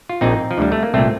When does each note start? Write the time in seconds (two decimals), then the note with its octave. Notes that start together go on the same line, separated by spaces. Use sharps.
0.09 F4
0.21 A#1 A#2 C4 D#4
0.51 F3
0.58 D2 D3 G3
0.72 A3
0.83 A#3
0.94 C2 A#2 A3 C4